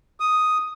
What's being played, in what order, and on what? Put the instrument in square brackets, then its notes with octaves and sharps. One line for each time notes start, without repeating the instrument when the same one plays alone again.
[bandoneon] D#6